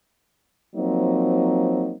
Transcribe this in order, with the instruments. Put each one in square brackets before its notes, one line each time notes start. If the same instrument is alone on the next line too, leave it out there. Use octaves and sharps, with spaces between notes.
[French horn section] F3 F#3 A#3 C4 D#4